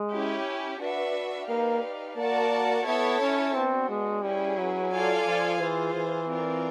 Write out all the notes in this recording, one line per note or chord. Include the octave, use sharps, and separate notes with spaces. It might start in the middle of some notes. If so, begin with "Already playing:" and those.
Already playing: G#3
C#4 E4 G4
D4 F#4 B4 E5
A#3 D#4 G4 B4 D5 F5
A#3 F#4 A#4 D5 F#5 A5
B3 E4 A4 C#5 E5 A5
C#4
B3 C4 D4 F#4
G#3
G3 C#4 E4 G#4 B4
F#3
F4 A4 D5 F5 G#5
F3
E3 F4 G#4 C5
E3
C4 F4 A#4 D5